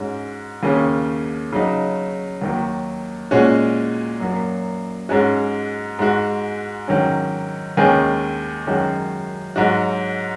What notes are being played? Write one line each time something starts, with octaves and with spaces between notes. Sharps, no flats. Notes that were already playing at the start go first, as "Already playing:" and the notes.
Already playing: G#2 G#3 C#4 F#4
D#2 C#3 A#3 C#4
C#3 F#3 D#4
D#2 D#3 F#3 A#3
A#2 G#3 C#4 F#4
F#2 F#3 A#3
G#2 G#3 C#4 F#4
G#2 G#3 F#4
G#2 D#3 F#3 C#4
D#2 D#3 G#3 C#4 G#4
F#2 D#3 G#3 C#4 F#4
G#2 F#3 D#4 F#4